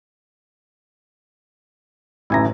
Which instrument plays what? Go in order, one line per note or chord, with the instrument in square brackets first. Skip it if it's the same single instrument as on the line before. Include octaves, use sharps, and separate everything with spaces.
[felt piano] A1 F#2 A2 [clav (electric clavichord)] E4 G#5 A#5